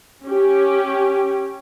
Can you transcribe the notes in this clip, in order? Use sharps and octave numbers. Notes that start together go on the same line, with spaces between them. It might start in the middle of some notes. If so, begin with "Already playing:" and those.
C#4 G4